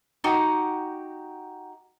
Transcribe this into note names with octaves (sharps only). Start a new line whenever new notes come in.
D#4 F#4 G4 F#5